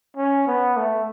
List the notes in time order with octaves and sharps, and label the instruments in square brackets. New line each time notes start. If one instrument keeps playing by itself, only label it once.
[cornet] C#4
B3
A3